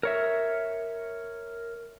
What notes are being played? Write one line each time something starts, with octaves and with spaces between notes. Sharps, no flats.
A#4 C#5 E5